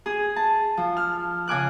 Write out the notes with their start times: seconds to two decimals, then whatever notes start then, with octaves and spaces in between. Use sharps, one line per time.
0.06 G#4
0.36 A5
0.77 F3
0.97 F6
1.48 C#3 G#5 D6 F#6